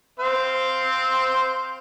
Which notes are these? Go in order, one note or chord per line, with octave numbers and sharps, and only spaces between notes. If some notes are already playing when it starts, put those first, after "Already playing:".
C4 C5 F5